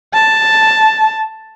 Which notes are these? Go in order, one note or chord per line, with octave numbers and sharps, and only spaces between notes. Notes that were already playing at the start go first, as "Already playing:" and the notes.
A5